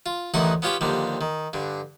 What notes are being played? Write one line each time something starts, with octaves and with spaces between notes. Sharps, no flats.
F4
A1 D2 D#3 E3 D#4 F#5
B3 C#4 F4 G4 G5
D#2 D3 F3 G3
D#3
G2 D3